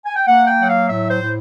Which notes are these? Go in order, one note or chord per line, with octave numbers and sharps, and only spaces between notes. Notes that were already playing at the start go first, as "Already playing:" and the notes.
G#5
G5
A#3 F#5
G5
F#3 F#5
F5
A2 E5
C5
A2